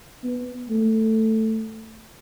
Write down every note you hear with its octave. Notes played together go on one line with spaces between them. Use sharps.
B3
A3